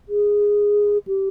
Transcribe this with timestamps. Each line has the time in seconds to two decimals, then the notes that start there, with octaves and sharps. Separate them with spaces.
0.09 G#4
1.07 G4